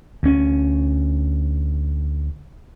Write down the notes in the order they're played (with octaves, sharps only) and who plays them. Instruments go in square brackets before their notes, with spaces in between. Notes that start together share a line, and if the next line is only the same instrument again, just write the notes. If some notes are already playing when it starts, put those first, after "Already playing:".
[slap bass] D2 C#4